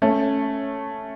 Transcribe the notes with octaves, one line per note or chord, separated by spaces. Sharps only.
A3 C#4